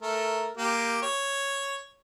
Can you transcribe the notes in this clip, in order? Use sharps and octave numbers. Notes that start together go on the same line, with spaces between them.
A3 A#4
A#3 G4
C#5